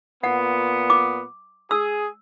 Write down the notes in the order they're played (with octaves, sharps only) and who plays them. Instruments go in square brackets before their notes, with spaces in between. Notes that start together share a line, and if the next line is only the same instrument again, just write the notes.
[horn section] A#2 B3 [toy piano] F#5
[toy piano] D6
[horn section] G#4 [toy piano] E6